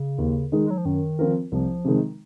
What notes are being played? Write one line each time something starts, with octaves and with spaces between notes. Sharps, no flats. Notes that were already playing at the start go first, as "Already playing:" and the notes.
Already playing: C#3
D#2
D#3 G#3 D#4
G#3
F#3
F3
F#2 D#3
F3 C4 F4 A#4
C2 F3
C3 D#3 G#3